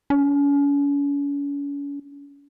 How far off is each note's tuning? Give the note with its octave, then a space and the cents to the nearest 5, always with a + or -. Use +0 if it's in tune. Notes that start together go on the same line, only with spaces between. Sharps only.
C#4 +40